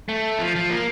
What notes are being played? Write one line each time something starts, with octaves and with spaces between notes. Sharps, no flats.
A3
F3
F3
A#3